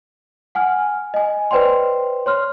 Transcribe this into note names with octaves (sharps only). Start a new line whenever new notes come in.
F#5 G#5 F6
D#5 G#5
B4 C5 D5 G5 C6
C#5 C6 F6